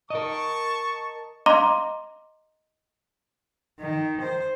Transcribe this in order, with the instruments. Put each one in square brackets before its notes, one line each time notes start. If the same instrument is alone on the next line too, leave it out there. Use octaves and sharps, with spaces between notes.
[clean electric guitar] A#4 D#5 [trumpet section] A5 C#6
[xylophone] D#5 F5 A#5 C6 D6
[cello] D#3
C5